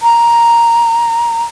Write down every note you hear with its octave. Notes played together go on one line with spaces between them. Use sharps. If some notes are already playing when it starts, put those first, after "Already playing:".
A#5